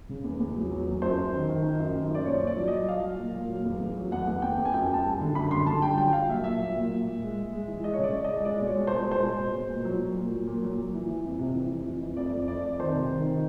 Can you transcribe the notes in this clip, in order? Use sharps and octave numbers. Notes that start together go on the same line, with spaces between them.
C#3
E2
E2
F#3
F#3
E2
F#2 C5
F#2
D#3
D#3
D#3
F#2
D#3
F#2 D5
A#2 C#5
A#2
D5
F#3
F#3 D#5
F#3 F5
F#3
A#2
A#2
F#3
E2
E2
F#3
E2 F#5
E2
E2 G5
E2
G#5
F#2 G5
F#2
A5
G3
D3
F#2 B5
D3 C6
D3 A5
G3 G5
F#3 G5
F#3 F5
A#2 E5
A#2 E5
F#3
A#2
A#2
A#2
G#3
G#3
G#3
E3
G#3 D#5
C#3 C#5
D5
G#3
D#5
G#3
G#3 D5
B2
C#5
G#3
B2 C5
G#3 C5
B2
B2
B2
A#2
F#3
A#2
A#2
F#3
A#2
F#3
A#2
E3
E3
F2
C3
E3
F2
E3
F2
F2 D5
F2
F2 D5
F2
D#3 C5
C3
D#3
D#3